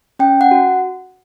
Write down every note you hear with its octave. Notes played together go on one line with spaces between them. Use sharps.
C#4 G5
F#5
F#4